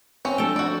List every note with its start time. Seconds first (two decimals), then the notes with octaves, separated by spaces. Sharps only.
0.25 C4 C#4
0.38 F3 A3 D4 A4 G5
0.56 F#4 D5